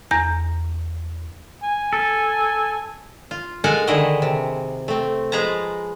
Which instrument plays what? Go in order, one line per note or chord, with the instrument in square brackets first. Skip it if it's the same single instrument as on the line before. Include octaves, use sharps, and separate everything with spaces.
[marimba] E2 A#5 A#6
[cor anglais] G#5
[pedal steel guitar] A4
[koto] F4
G#3 A4 A#4 F5 F#5 G#5
D3 D#3 E4 G#4 D#5
C3
A3 C4
F3 G#3 G#4 B4 A5 A#5